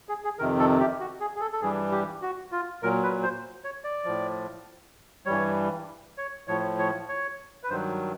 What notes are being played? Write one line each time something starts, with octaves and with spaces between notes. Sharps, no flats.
G#4
G#4
F2 C3 D#3 A#4
A4
G4
F#4
G#4
G#4
A4
A4
G2 E3 G3 G#4
G4
F#4
F4
A#2 F#3 A#4
B4
C5
C#5
D5
A2 F3
G2 E3 G3 C#5
C#5
A2 F3 C#5
C#5
C#5
B4
G2 D#3 F#3 C5